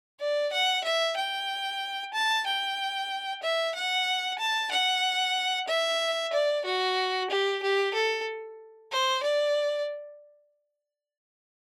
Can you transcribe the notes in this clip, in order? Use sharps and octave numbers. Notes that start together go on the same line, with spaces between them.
D5
F#5
E5
G5
A5
G5
E5
F#5
A5
F#5
E5
D5
F#4
G4
G4
A4
C5
D5